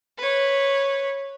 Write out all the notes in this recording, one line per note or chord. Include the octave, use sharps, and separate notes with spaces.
B4 C#5